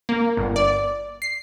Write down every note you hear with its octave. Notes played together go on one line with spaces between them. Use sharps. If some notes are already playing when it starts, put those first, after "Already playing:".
A#3
G1
D5
C7